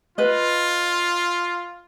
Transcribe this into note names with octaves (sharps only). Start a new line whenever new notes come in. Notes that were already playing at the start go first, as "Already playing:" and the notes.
F4 B4 D#5